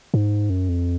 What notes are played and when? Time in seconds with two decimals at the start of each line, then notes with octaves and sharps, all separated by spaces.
0.14 G#2
0.50 F#2
0.69 F2